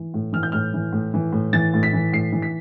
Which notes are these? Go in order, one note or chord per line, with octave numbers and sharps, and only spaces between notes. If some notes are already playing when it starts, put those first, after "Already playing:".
Already playing: E3
A2
E3 F6
G6
A2 F6
E3
A2
E3
A2
E3 A6
A2
B6
E3
A2 C7
E3
B6